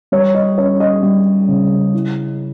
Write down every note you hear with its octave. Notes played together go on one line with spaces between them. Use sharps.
G3 C#5
D#5
C#4 C#5
D#5
G3
C#3
E4